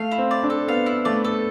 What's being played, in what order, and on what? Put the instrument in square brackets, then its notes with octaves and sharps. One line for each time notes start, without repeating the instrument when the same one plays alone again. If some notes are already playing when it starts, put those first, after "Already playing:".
Already playing: [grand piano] A3 [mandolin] F5
[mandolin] E4
[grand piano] C4
[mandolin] D5
[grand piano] D4
[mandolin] A4
[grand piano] B3 [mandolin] F5
[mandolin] E4
[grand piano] A3 [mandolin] D5
[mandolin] A4